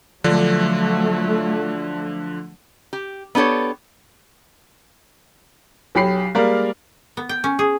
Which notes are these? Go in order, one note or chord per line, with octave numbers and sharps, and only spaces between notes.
D3 F3 F#3 A3 D4
G4
B3 D4 G4 A4 C#5
B1 F#3 G4 B5 C7
G3 G#3 A#3 A#4 D5 F5
B3
G5
C#4
G#4